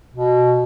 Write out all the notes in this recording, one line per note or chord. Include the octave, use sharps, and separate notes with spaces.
B2